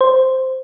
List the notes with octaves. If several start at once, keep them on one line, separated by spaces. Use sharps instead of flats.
C5